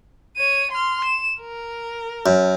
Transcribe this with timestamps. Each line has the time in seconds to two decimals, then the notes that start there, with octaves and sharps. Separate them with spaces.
0.37 C#5 D#7
0.72 C6 F6
1.05 E7
1.40 A#4
2.26 F#2